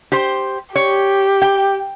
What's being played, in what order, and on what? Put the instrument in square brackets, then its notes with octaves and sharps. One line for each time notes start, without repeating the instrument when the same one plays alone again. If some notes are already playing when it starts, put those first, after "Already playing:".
[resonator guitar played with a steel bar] G4 C5
[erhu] G4 [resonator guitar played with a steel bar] C#5
[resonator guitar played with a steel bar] G5